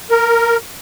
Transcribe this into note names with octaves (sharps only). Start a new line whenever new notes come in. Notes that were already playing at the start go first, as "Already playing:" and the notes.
A#4